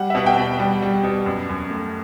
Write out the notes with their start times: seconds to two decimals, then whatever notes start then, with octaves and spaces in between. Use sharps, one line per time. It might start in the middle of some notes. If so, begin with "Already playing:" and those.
Already playing: G3 F#5
0.10 E5
0.15 B2 F#5
0.26 G5
0.37 B2
0.60 G3
0.82 G3
1.04 B2
1.26 F#2
1.49 F#2
1.70 A3